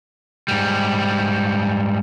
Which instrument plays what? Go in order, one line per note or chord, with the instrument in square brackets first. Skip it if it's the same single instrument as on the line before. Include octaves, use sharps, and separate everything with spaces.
[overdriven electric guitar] G#2 G3